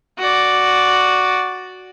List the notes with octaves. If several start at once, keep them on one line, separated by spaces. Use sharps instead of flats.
F#4 D5